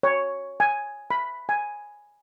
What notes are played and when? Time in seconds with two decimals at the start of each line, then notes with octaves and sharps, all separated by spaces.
0.03 C#5
0.60 G#5
1.11 B5
1.49 G#5